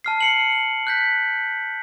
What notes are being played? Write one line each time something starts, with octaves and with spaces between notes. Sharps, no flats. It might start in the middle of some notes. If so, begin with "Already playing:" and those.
A5 F6 C7
C7 C#7 F#7
F#6 G6 B6